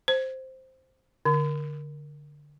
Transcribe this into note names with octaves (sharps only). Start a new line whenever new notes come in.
C5
D3